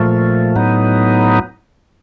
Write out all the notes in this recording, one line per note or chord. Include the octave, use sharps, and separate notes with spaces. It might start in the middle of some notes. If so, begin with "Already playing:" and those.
Already playing: A#2 F3 A3
A2 F#3 B3 D#4